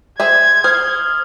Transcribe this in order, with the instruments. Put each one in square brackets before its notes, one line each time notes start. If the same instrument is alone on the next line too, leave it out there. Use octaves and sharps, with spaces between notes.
[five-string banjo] G#4 C5 E5 [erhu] G#6
[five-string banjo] C5 [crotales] D#6 F6